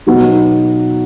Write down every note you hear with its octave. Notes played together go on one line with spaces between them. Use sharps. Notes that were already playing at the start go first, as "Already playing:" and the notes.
B2 F#3 B3 D#4 F#4